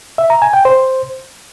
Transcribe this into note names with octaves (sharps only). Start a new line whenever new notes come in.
E5
A#5
G#5
G5
C5